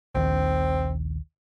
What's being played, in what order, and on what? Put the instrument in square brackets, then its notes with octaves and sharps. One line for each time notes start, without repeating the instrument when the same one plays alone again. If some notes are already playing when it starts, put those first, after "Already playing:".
[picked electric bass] A#1 D#2 D#3 [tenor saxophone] C4